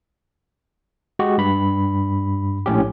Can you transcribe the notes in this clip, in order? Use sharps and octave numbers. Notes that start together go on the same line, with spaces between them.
G#3 F#4 G4
G2 B5
A#1 A2 C#4 G4